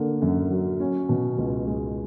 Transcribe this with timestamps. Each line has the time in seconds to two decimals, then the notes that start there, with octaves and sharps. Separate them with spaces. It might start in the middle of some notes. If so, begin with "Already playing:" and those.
Already playing: D3 A#3
0.22 F#2
0.51 F#3
0.80 C#4
1.09 B2
1.38 C#2
1.67 G#3